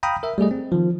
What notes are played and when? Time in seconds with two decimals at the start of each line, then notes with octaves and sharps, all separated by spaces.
0.03 F5 G5 A#5 B5 D#6
0.23 A#4 E5
0.38 G3 A3 G#4 D#5
0.51 C4
0.72 D#3 F3